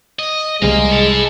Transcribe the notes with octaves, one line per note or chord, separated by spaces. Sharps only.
D#5
C2 F3 G3 G#3 A#4 F5
E4 A4